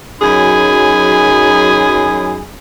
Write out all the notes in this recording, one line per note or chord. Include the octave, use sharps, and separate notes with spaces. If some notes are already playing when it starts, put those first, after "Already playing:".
F#2 F#3 D#4 G#4 G#5 B5